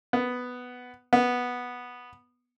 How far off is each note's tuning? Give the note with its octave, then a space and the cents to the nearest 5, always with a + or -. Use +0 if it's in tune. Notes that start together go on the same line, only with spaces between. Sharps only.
B3 +5
B3 -5